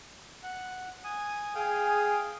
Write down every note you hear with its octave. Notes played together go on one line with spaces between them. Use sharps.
F#5
G#5 D#6
G#4 F5 G5 D#6